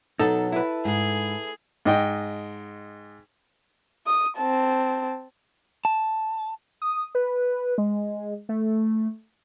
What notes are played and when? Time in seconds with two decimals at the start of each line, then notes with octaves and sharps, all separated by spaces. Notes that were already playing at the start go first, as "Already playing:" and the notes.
0.19 B2 F#3 D#4 A4
0.52 E4 B4
0.85 G#2 G#4
1.85 G#2 D#5 G5
4.07 D#6
4.37 C4 A5
5.85 A5
6.82 D#6
7.15 B4
7.78 G#3
8.49 A3